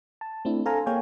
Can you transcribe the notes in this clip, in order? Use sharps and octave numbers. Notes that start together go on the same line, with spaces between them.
A5
A3 C4 D4 E4
A4 C5 F5 G#5 A#5
A#3 G#4 C#5 F5 G5 G#5